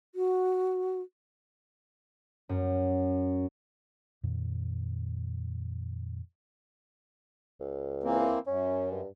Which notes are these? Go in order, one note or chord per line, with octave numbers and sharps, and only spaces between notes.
F#4
F#2
F2 A#2 D#3
C#2
E3 A#3 C4
F#2 C#4
G2